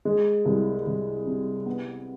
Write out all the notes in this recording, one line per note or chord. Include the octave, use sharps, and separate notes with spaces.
G#3
C2
C2
C3
B3